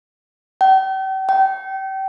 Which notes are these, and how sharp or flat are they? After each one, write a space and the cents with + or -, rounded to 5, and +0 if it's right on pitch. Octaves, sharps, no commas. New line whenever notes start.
G5 -40
G5 -30